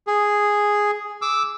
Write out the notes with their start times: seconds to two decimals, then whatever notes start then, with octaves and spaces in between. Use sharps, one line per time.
0.07 G#4
1.22 D6 E6